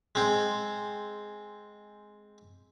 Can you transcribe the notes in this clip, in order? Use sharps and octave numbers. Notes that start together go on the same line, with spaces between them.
G#3 C4